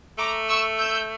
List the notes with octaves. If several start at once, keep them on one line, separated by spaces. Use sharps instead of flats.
A3 A#5 D6
C#6 E6
E6 G6